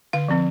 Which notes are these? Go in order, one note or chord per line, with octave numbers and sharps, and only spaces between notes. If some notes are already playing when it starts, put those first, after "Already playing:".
D3 F5
F3 C4